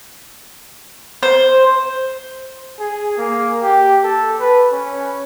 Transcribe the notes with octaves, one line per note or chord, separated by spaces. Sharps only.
C5
G#4
A#3
G4
A4
B4
C#4